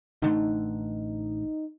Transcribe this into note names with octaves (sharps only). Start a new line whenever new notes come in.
A1 D3 A3 D#4